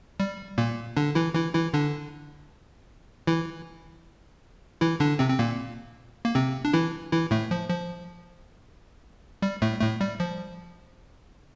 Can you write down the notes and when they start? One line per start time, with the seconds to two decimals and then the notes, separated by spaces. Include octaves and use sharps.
0.20 G3
0.58 A#2 A#3
0.97 D3 D4
1.15 E3 E4
1.34 E3 E4
1.54 E3 E4
1.74 D3 D4
3.27 E3 E4
4.81 E3 E4
5.00 D3 D4
5.19 C3 C4
5.29 C4
5.39 A#2 A#3
6.25 A#3
6.35 C3 C4
6.65 D4
6.73 E3 E4
7.12 E3 E4
7.31 A2 A3
7.51 F3
7.70 F3
9.42 G3
9.62 A2 A3
9.81 A2 A3
10.01 G3
10.20 F3